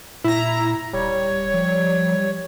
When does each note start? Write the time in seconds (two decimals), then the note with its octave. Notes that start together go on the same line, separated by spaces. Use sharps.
0.24 A#2 E4 A#5
0.93 D1 G3 C#5
1.54 F3